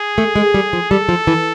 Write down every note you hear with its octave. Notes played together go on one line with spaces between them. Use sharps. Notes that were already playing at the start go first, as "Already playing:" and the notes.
Already playing: G#4
A3
G#3
G3
F3
G3 A4
F3
E3